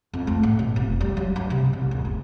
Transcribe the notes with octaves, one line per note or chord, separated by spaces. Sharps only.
F2
A3
A2
B2
F1
G3
F#3
G2
C3
C2
D1
G1